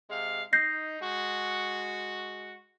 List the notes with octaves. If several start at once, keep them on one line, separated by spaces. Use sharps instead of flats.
C3 G#3 F5
D#4 G6 A#6 C7
G#3 F#4